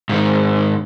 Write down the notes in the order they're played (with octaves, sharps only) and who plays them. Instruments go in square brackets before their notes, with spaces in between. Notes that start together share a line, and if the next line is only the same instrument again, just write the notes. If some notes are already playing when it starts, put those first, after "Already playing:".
[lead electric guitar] G#2 D#3